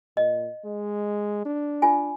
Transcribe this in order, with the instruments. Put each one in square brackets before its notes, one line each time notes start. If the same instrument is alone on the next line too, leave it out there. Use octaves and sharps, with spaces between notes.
[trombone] A#2 [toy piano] D#5
[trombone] G#3
D4
[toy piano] F4 G#5